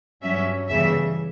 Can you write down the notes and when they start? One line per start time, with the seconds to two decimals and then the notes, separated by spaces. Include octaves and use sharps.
0.22 G2 F#3 C#4 E5
0.69 E2 C#3 E3 G3 E5